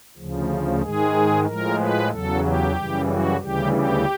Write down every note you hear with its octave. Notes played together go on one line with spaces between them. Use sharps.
D2 C#3 F3
G#2 D#3 G#3 G#4
A2 F3 G#3 A#4
B4
E2 C#3 F#3 A4
G4
F#2 C#3 E3 G3
F#4
D2 C#3 E3 G3 G4
G4